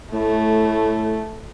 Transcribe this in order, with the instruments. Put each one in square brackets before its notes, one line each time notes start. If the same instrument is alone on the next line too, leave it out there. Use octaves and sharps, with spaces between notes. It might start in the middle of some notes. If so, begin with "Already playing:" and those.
[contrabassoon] A2 [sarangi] A3